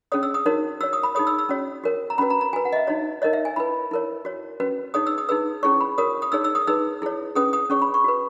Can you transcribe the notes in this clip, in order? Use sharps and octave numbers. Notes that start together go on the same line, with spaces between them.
C#4 G#4 C#5 D#6
E6
D#6
D#4 F#4 A#4 C#5
F#4 C#5 E6
D#6
B5
D#4 G#4 C#5 D#6
E6
E6
C#4 F#4 C#5
F#4 A#4 C#5
A#5
C#4 F#4 B4 B5
A#5
A#5
F#4 B4 G#5
F#5
D#5
E5
D#4 F#4 C#5
D#4 A#4 C#5 D#5
E5
G#5
E4 B4 B5
E4 A#4 C#5
F#4 C#5
C#4 F#4 B4
D#4 G#4 C#5 D#6
E6
D#6
D#4 G#4 B4 E6
C#4 E4 G#4 C#5 C#6
B5
F#4 A#4 C#5 D#6
D#6
D#4 G#4 C#5 E6
E6
D#6
D#4 G#4 B4 E6
E4 G#4 C#5
C#4 G#4 B4 D#6
D#6
C#4 G#4 C#5 C#6
B5
C#6
F#4 B4